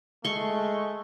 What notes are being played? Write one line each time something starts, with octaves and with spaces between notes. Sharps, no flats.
G#3 A3 C6 C#6